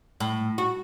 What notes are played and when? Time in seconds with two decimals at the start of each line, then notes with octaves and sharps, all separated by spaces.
0.20 A2
0.58 F#4